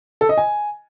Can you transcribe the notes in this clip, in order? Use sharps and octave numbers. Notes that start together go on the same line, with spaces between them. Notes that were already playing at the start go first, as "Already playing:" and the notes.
A4
D#5
G#5